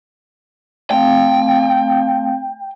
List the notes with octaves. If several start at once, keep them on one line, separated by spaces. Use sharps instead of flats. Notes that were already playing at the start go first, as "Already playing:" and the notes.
A3 C4 F5 G5